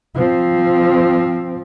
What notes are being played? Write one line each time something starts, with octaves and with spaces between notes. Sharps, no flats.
F3 C4